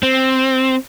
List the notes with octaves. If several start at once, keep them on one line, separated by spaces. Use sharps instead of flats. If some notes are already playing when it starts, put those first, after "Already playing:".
C4